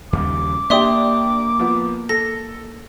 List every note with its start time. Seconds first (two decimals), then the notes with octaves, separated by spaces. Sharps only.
0.13 D#2 C#3 G3 D6
0.70 A#3 D4 G4 E5 C6 D#6
1.59 F3 B3
2.09 A4 A#6